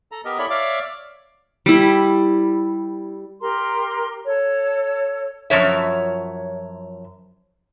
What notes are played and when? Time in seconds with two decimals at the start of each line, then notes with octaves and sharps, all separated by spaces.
0.12 A4 A#5
0.25 B3 G4 A#4 D#5
0.38 E4 A4 C#5 D5 E5 B5
0.50 C#5 D5 E5 F5 D6
1.66 G3 E4
3.41 G4 A#4 A#5 C6
4.26 A4 C#5
5.50 F#2 F3 C#5 E5